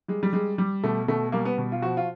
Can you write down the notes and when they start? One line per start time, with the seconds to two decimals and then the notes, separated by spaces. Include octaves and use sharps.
0.08 G3 G#3
0.23 G3
0.33 G3 G#3
0.58 G3
0.83 B2 A3
1.08 B2 A3
1.32 G3 A#3
1.45 B3
1.58 B2
1.72 F4
1.82 F3 F#4
1.97 F4